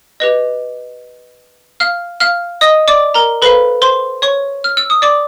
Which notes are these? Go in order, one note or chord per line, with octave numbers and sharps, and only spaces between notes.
G4 B4 D#5
F5 F6
F5 F6
D#5 D#6
D5 D6
A#4 A#5
A4 B4 C5 F5 B5
C5 C6
C#5 C#6
F6
E6
D#6
D5 D6